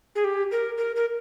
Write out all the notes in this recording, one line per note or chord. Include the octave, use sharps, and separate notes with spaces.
G#4
G4
A#4
A#4
A#4